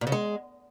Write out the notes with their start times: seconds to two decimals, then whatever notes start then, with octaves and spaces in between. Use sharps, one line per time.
0.01 A#2
0.07 C#3
0.12 G#3